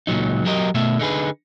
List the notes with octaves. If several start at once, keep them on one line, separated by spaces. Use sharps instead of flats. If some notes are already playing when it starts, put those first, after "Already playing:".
C#2 A#2 F3 F#3 D#4
F#3 G4 A#4 D#5
B2 A3 E5
D3 D#4 G#4 B4